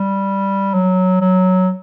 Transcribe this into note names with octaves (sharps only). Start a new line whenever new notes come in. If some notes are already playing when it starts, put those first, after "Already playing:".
Already playing: G3
F#3
F#3